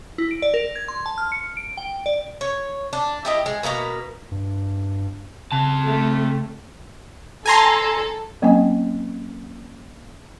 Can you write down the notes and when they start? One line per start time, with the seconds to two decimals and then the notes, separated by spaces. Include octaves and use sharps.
0.18 E4
0.31 D7
0.42 D5
0.54 A#4
0.76 G#6
0.88 C6
1.06 A5
1.18 F6
1.32 C#7
1.57 D7
1.77 G5
2.06 D5
2.41 C#5
2.93 D4
3.25 E4 G4 D#5
3.46 G#3
3.63 B2 D#3 A#3 B4
4.32 G2
5.52 C#3 C4 A5
5.86 A3
7.46 A4 G#5 A#5 C6
8.42 F#3 A#3 C4 C#4 D#5 G#5